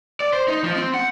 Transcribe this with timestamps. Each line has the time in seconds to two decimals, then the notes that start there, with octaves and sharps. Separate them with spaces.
0.20 D5
0.33 C5
0.48 D#4
0.64 F3
0.76 C4
0.94 F#5